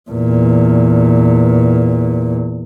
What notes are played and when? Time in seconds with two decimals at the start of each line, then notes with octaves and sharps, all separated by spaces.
0.10 E2 A#2